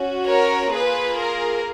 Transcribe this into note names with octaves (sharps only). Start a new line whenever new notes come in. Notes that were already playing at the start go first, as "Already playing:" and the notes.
Already playing: C#4 F#4
A#4 C#5
A#3 F4 G#4 B4
A#4